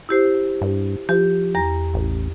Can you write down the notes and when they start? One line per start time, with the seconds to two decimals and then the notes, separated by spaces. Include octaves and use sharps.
0.09 E4 G4 C5
0.61 G2
1.09 F3 G4
1.55 E2 A#5 A#6
1.94 A1